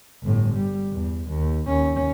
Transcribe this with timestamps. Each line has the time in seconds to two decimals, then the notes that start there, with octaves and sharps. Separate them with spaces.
0.23 G1 A2
0.55 G3
0.93 E2
1.29 D#2
1.67 D#2 C#4